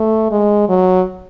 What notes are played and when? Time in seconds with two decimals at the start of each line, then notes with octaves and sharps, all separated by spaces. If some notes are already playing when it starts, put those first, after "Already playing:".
Already playing: A3
0.31 G#3
0.69 F#3